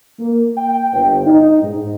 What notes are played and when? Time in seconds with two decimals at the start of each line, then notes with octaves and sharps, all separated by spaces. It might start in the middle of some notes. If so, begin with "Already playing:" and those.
0.19 A#3
0.58 G5
0.93 G1
1.27 D#4
1.63 G#2